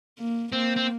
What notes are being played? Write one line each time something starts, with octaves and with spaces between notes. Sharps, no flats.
A#3
A#3 C4
C4